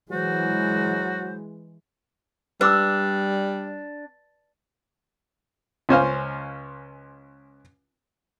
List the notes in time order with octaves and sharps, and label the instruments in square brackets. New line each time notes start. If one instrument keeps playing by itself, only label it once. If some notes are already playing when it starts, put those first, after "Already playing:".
[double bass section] E3 G#3 [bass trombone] F#3 [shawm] F#4 [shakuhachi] C5
[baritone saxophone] G3 [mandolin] D4 [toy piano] B4 D6 E6
[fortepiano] C#2 C#4 C5 F5